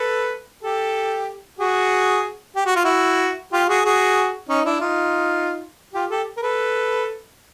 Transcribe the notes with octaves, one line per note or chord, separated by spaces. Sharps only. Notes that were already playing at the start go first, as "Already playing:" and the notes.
Already playing: A4 B4
G4 A4
F#4 G#4
G4
F#4
F4
E4 F#4
F4 G4
F#4 G#4
F#4 G#4
C#4 D#4
D4 E4
D#4 F4
F4 G4
G4 A4
A#4
A4 B4